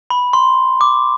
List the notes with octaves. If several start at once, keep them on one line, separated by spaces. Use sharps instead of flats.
B5
C6
D6